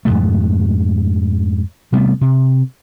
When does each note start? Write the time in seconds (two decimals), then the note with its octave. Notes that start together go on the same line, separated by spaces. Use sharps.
0.05 F2 G#2 B2 A3
1.92 C3 G3 A3 B3
2.21 C3